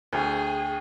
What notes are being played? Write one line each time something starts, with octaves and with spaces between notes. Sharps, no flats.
D2 G#4 G5